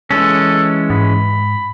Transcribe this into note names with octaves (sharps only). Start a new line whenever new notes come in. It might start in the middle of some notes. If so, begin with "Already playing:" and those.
E3 G#3 C#4 A4
G#2 B5